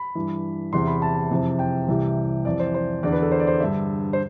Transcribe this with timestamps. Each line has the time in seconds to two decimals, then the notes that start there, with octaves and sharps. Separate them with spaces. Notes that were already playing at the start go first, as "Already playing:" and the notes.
Already playing: B5
0.15 G2 E3
0.73 E2 C3 E3 C6
0.87 B5
1.02 A5
1.31 F2 C3 E3
1.59 G5
1.88 C2 C3 E3
2.45 F2 E3 D5
2.60 C5
2.74 C5
3.03 E2 D3 D5
3.12 B4
3.22 A4
3.32 C5
3.40 D5
3.47 C5
3.60 G2 D3 E5
4.13 C5